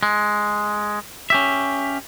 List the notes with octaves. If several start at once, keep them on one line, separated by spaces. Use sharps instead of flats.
G#3
C#4 G4 E5